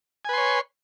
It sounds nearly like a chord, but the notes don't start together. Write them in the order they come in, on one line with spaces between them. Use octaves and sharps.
G#5 B4 C6 C#5